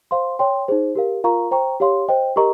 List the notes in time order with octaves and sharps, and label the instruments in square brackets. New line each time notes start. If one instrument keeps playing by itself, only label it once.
[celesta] C5 F5 C6
C#5 G5 C6
D#4 G#4 C5
G4 A#4 F5
F4 A#4 F5 A#5 C#6
C5 G5 A#5 C#6
G4 C#5 F5 C6
C5 D#5 G5
G4 A#4 D#5 A#5 C#6